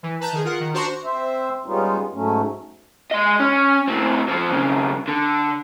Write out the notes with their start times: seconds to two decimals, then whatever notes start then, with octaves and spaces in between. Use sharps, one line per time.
0.03 E3
0.20 B4 A5 A#5 G6
0.33 D#3 G#4
0.45 F4 A#4 F#5
0.60 D#3
0.73 D4 F#4 C5 A#5 C6 C#6
1.05 C4 C5 E5
1.66 G3 G#3 B3 C#4 D#4 F4
2.13 G#2 F#3 A3 C#4
3.11 G#3 D#5
3.40 C#4
3.88 A2 C4
4.29 F3 C4
4.50 B1 C#3
5.08 D3